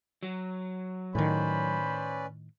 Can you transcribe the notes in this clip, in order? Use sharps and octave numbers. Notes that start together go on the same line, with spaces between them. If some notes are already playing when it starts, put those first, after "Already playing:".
F#3
A2 D#3 C#4 B4 C5 D5 B5